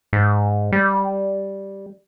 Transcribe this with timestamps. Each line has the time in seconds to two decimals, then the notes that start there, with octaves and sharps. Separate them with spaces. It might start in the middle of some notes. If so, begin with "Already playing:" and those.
0.13 G#2
0.72 G3